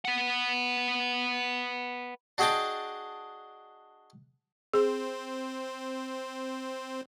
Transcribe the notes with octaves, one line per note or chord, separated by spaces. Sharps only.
B4 F#5
D4 F#4 G#4 D#5 G5 A5
C4 G#4 C5